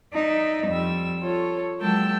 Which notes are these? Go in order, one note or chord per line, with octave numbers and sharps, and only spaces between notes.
D#4 D5 E5
F2 G3 E6
F4 A4 C#5
F#3 G#3 A#3 G5 A5 E6